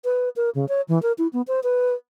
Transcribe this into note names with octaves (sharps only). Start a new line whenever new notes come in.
B4
A#4
C#3
C#5
E3
A#4
E4
B3
C5
B4